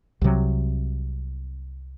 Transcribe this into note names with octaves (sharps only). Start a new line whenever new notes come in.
C2 C3 F#3